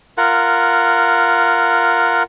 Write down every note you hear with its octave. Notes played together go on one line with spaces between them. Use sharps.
F4 A#4 F#5